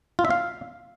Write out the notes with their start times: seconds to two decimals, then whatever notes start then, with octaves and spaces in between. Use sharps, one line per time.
0.19 F4
0.25 E5
0.30 F5